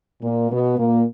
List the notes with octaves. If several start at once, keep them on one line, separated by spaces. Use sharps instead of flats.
A#2 A#3
B2 B3
A#2 A#3